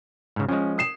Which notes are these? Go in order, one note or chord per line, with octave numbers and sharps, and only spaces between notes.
G#2 C#3
F3 G#3 C#4
D#6 C7 E7